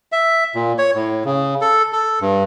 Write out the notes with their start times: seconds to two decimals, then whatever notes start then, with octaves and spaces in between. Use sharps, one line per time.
0.12 E5
0.55 A#2
0.78 C#5
0.95 A2
1.25 C#3
1.61 A4
1.93 A4
2.21 G2